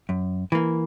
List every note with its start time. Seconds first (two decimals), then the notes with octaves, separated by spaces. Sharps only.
0.09 F#2
0.52 E3 A#3